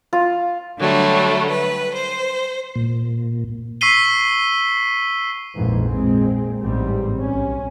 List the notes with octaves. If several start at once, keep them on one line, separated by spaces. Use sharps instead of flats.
F4
D3 F#3 G3 A3
B4
C5
A#2
C#6 E6 B6 C7 D#7 G7
A#1 F2 G#2 E3
A#2 G#3 C4
A1 G#2 G3 C4
B1 C#4